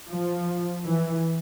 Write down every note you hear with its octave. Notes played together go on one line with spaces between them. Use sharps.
F3
E3